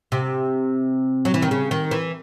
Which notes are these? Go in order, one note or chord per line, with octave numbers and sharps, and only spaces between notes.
C3
F#3
E3
D#3
C#3
D#3
E3